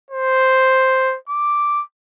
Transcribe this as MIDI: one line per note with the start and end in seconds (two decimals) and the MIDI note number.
0.11 1.17 72
1.29 1.83 86